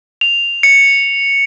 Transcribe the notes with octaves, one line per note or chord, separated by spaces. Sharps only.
F7
C#7